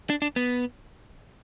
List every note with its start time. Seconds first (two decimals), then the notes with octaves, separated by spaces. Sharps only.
0.10 D4
0.22 D4
0.36 B3